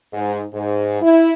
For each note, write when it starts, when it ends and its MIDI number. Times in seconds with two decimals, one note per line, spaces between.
0.13 0.42 44
0.54 1.01 44
1.02 1.34 64